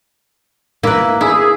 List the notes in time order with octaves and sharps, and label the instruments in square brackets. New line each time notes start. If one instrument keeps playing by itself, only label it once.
[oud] A#3 [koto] E4 B4
[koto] E4 [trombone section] G#4